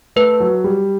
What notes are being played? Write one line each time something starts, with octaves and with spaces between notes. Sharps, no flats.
A3 B4
F#3
G3